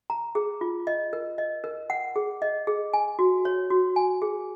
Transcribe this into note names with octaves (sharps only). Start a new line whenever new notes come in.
A#5
G#4
F4
D#5
A#4
D#5
A#4
F#5
G#4
D#5
G#4
G#5
F#4
C#5
F#4
G#5
G#4